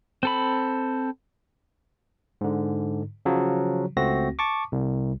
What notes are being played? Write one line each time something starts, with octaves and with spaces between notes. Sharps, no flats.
C4 A4 B5
G#2 D3
C#3 F3 F#3
C#2 A3 C4 F#4 A#6
A5 C#6 D6
C2